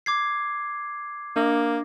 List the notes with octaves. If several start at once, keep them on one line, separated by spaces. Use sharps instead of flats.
D6 G#6 C7
A#3 D4 A#6